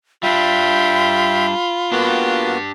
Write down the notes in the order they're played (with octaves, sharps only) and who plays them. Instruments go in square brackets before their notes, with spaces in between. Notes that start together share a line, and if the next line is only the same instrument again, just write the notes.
[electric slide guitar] G3 D4 [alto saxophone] F4 [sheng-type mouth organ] E5 G5 [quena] B5
[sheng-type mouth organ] A#3 B3 F#4 [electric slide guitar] D4 G4